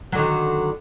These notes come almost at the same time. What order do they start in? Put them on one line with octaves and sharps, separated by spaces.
F#3 D3 D#3